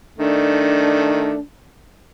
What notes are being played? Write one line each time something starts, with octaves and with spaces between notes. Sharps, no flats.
D#3 A3 D4